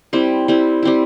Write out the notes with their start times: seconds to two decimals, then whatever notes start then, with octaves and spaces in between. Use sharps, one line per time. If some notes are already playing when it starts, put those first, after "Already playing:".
0.13 G3 C4 E4
0.48 G3 C4 E4
0.83 G3 C4 E4